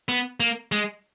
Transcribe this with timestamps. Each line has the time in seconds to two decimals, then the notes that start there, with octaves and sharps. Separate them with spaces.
0.09 B3
0.40 A#3
0.72 G#3